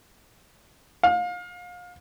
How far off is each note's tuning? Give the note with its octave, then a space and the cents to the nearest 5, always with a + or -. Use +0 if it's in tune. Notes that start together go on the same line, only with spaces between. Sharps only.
F5 +30